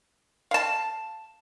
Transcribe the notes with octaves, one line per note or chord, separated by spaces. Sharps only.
F5 A5